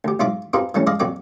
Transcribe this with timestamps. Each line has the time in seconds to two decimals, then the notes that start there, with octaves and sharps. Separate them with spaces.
0.04 D2 G4
0.19 B1 G#2 F4 D5 E5 D6
0.53 C4 D#4 F4 G4 G#4 B4
0.74 E3 G3 A3 C#4
0.87 G#3 D5 D#5 F5
1.00 A#1 F2 F#4 D5 G5